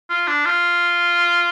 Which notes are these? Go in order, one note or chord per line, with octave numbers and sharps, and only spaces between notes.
F4
D4
F4